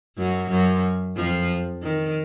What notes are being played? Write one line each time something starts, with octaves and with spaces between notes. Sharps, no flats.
F#2 F#3
F#2 F#3
F2 F3
D#3